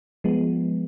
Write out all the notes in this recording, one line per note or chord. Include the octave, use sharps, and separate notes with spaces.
F3 G#3 B3